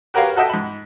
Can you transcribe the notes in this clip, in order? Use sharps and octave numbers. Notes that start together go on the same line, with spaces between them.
F#4 G4 A#4 B4 C#5 F5
F#4 A4 D#5 E5 G5
G#2 B5